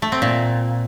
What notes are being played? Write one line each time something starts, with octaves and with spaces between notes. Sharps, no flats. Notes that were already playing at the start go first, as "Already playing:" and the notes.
A3
C4
A#2